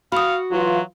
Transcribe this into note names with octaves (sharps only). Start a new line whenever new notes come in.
F#4 F5 F#5 B5 D#6
E3 F#3 F4